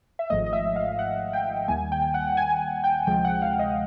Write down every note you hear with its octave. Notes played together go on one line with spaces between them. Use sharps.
E5
G#1 G#2 F3 A3 D#5
D#5
E5
F5
F#5
G5
D#2 D#3 G3 A#3 G#5
G5
F#5
G#5
G5
D2 C3 F3 G#3 G5
F#5
F5
D#5